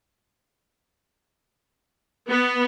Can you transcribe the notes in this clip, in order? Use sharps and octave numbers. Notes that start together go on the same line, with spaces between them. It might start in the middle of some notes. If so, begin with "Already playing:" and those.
B3